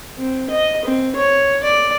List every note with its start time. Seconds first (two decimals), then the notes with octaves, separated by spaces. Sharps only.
0.19 C4
0.50 D#5
0.85 C4
1.16 C#5
1.64 D5